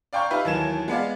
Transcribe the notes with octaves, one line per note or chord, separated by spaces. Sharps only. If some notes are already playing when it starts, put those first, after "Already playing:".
D5 F5 G5 A#5 C#6 G6
D#4 G4 B4 E5 F5
D#2 E3 F#3 A#3 G#6 E7
G#3 B3 D5 F5